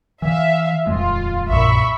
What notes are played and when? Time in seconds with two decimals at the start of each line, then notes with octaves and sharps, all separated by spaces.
0.22 E3 E5 F5
0.87 D#1 F2 G#3 F4
1.49 A#1 F#2 A#2 E5 B5 C#6